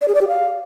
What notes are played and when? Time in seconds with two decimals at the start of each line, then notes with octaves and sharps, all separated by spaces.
0.01 D5
0.08 G#4
0.15 D5
0.21 G4
0.28 F5